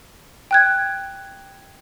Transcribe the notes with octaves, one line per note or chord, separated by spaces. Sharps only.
G5 F#6 G#6